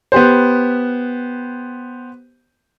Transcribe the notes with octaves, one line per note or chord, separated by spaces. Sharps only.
B3 G4 C5